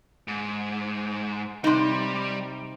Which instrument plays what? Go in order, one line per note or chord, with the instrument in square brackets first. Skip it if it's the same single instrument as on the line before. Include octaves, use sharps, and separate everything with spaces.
[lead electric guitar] G#2
[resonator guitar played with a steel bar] C3 D#4 [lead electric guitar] G3 B5